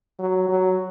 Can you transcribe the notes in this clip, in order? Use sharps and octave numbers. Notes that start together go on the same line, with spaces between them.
F#3
F#3